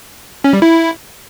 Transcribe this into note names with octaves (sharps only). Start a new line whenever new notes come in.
C#4
G3
E4